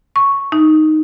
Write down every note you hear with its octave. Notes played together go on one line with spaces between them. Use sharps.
C#6
D#4